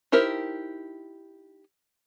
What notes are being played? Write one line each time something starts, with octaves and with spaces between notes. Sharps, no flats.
D#4 E4 G4 A#4 C5